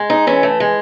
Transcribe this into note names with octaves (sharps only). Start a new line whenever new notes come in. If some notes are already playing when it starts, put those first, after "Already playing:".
Already playing: G#3
D#4
E3 C#4
A3
G#3